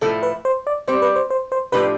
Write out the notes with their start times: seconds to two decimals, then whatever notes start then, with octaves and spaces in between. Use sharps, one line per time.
0.01 A2 F3 A3 E4 A4
0.23 B4
0.45 C5
0.67 D5
0.87 G3 C4 G4 C5
1.02 B4
1.16 C5
1.30 C5
1.52 C5
1.72 A2 F3 A3 D4 G4 B4